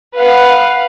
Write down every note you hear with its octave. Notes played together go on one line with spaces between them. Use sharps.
B4 F5 F#5